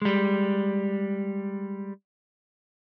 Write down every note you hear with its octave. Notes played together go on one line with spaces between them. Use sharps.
G3 G#3